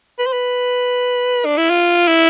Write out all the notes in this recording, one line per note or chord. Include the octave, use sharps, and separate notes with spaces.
B4
C5
B4
D4
E4
F4
E4